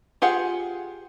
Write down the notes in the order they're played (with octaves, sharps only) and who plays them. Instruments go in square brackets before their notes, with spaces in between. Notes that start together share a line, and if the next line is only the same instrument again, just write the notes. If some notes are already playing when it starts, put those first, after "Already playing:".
[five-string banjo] F4 G4 G#4 F#5